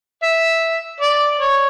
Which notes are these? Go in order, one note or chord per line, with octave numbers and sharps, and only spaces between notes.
E5
D5
C#5